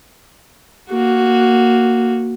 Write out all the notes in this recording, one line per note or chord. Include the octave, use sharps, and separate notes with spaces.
A#3 F#4